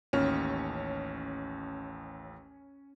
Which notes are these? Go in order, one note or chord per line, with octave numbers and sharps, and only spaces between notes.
A1 D#2 C#4 F6